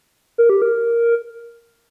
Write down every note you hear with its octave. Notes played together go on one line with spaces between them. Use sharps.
A#4
G4
A#4